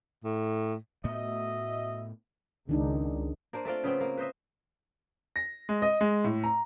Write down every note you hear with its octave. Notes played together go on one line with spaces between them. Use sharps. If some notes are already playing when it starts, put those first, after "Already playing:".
A2
A2 A3 B3 F#4 D#5 E5
C#2 D#3 D4 D#4
A#3 D4 C5
A3 C4 D4 F4
C#3 B3 C4
A#3
B4 C5 D#5 E5
A#6
G#3
D#5
G#3
A2
A#5